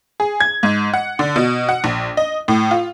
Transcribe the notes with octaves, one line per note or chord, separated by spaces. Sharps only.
G#4
G#6
G#2
F#5
D3
B2
F#5
A#1
D#5
A2
F4